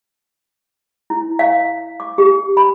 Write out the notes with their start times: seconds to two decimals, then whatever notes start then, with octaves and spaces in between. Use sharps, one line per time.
1.10 E4
1.39 F5
2.00 D6
2.18 G4
2.57 B5